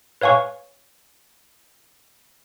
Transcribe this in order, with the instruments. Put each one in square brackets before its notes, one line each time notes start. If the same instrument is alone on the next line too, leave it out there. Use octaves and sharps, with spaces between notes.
[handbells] B4 C#5 F5 G#5 C#6